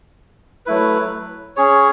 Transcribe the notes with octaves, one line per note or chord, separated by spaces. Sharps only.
F#3 A3 E4 B4
C#4 G#4 C#5